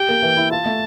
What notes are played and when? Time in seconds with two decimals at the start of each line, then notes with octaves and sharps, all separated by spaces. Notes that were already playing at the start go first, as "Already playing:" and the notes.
Already playing: G4 G5
0.09 A#3
0.22 E3
0.37 E4
0.51 F4 A5
0.66 A3